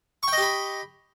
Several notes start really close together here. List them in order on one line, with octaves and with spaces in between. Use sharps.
C#6 G5 D#5 G4 B5